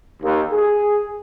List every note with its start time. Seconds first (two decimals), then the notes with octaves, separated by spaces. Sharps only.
0.23 D#2
0.53 G#4